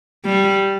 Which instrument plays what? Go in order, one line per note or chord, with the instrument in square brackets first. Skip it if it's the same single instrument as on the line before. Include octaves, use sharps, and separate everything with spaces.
[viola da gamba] G3